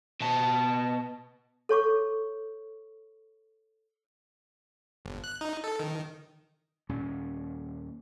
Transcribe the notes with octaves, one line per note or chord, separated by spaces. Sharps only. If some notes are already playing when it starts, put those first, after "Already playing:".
B2 A5
A4 C#5 C#6 D6
G1
F#6
D#4
A4
D#3
D#2 A#2 G3 C#4